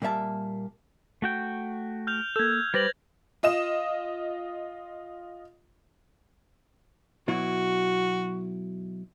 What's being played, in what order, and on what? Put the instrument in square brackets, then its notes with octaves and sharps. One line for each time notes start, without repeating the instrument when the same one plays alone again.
[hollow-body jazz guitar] A#2 G3 A#3 E5 A5
[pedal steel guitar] A3 F#4 G5
[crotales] F6 G6 F7
[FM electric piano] A#3 A4 [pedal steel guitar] E6 [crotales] G6 G#6
[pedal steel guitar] G3 G4 [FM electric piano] B4 C5 [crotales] A6 A#6 F#7
[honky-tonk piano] F4 D#5 D#6 E7
[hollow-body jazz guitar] B2 F#3 E4 [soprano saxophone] F#4